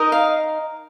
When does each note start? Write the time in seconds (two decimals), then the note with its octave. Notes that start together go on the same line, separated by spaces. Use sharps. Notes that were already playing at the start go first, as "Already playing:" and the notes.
Already playing: D#4 A#4 D#5
0.12 F5